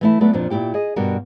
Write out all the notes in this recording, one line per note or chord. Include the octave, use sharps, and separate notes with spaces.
E3 A3 E4
F#3 A3 B3 B4 D5
F2 A#2 F3 D4
A#2 C#3 E4 G4 G5
G#4 D#5
G2 B2 F#4 G4 A#4